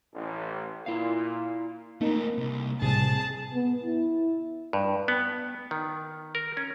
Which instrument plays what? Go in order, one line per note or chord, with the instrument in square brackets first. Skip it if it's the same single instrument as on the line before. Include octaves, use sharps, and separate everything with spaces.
[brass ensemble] A1
[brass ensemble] A#2 [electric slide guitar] E4 F5
[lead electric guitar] A3 C4 [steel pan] A#3 D#4
[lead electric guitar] C2
[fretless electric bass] A2 C3 G3 [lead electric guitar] G#4 [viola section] A5
[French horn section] B3
E4
[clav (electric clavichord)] G2
B3
D#3
A#4
C#4